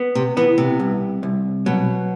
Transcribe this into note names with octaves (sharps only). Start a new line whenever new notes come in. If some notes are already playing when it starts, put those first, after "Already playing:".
Already playing: B3
C3
E3 B3
C3
C2
C2
B2 F#3